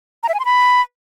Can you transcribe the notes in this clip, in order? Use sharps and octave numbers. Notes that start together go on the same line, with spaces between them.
A#5
E5
G#5
C6
B5